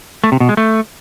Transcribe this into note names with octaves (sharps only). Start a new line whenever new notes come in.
A3
C3
B2
G#3
A3